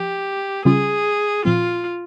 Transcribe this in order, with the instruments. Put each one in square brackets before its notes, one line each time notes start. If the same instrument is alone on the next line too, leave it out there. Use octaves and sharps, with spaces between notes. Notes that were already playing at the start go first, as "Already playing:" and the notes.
Already playing: [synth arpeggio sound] F3 [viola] G4
[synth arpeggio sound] C#3 G3 C#4 F4 [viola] G#4
[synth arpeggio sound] A#2 F3 C4 [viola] F4